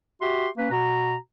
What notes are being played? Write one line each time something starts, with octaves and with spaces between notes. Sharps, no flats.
F#4 G4 E5 C6
A#3 C#4 B4
B2 F#4 A#5